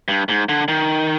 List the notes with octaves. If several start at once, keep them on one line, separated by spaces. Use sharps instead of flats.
G2
G#2
D3
D#3